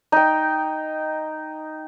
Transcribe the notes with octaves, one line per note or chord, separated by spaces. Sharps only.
D#4 G5